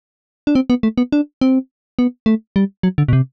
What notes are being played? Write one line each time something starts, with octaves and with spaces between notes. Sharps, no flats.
D4
C4
B3
A3
B3
D4
C4
B3
A3
G3
F#3
D3
B2
C3